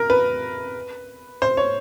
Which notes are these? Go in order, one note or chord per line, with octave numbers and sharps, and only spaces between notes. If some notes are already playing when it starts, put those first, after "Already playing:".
Already playing: A#4
B4
C5
C#5